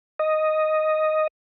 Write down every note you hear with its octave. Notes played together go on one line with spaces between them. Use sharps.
D#5